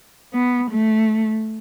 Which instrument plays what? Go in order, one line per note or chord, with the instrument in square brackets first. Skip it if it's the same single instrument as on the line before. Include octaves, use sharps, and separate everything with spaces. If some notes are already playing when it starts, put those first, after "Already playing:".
[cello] B3
A3